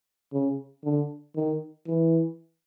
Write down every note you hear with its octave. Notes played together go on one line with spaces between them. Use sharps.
C#3
D3
D#3
E3